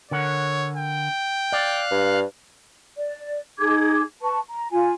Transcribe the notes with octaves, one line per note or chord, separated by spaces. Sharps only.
D3 A#4 C#5 F#5
G5
D5 F5 F#6
G2
D5
D#4 G#4 D6 G#6
B4 A5 C#6
A#5
F4 G#5